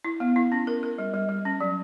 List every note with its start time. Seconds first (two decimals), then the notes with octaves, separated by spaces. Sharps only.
0.05 E4
0.20 B3
0.36 E4
0.52 C#4
0.67 A#4
0.83 A#4
0.98 G3
1.14 G3
1.29 G3
1.45 C#4
1.61 F#3